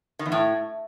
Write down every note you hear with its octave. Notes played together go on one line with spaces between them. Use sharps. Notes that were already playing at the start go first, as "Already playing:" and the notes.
D#3
E2
A2